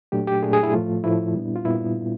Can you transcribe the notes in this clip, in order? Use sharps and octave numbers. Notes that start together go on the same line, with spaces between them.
A#2 F#3 A3 D4 G4
G4
A#2 F#3 A3 D4 G#4
G#4
E4
A2 F3 A3 F4
A2 F3 A3 E4
A#2 G3 B3 D4
F4
A#2 G3 B3 E4